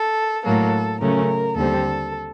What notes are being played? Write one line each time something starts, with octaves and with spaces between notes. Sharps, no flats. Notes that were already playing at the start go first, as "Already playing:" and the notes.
Already playing: A4
A2 F#3 A#3 A4
C#3 F#3 A3 C#4 A#4
D#2 D3 G3 C4 A4